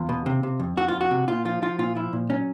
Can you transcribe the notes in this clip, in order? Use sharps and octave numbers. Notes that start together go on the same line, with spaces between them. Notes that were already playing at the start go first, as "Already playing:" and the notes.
Already playing: E2 F4
B2
C3
C3
F2
F2 F#4
F4
F2
F#4
C3
A#2 F4
F3 F4
F3 F4
A#2 F4
F3 E4
A#2
F#3 C#4